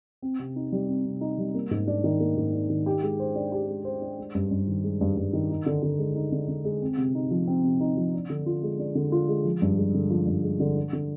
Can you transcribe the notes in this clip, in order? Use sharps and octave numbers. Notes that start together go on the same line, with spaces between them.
C4
C3
D#4
G3
C4
C3
D#4
G3
A#3
G#2
D4
D#3
A#3
G#2
D4
D#3
G4
G#3
C5
D4
G4
G#3
C5
D4
G#3
G2
G2
D#3
G#3
G2
G2
D#3
D#4
D3
D3
G#3
D#4
D3
D3
G#3
C4
C3
D#4
F3
C4
C3
D#4
F3
D4
D3
F4
G#3
D4
D3
F4
G#3
F3
G2
G#3
D3
F3
G2
G#3
D3
D4
D3